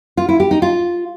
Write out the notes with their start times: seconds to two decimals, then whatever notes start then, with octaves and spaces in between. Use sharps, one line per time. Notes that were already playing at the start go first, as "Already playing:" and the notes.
0.17 F4
0.29 E4
0.40 G4
0.51 D#4
0.62 F4